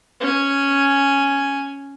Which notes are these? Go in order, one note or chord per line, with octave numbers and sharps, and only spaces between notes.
C#4 G#5